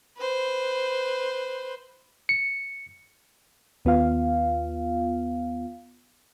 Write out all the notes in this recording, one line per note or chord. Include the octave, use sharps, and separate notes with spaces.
B4 C5
C#7
D#2 B3 F4 F5